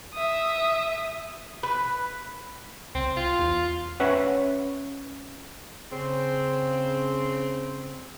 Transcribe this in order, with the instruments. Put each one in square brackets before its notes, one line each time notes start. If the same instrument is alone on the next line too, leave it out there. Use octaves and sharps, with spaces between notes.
[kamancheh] E5 D#6
[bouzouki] B4
[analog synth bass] C#2 [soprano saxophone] C4
[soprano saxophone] F4
[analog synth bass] E2
[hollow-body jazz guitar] C#4 B4 C#5 E5 F#5
[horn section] C#3 C4